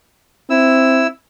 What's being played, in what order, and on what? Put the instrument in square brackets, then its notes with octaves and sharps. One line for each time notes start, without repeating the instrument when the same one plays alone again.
[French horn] C4 [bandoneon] E4 E6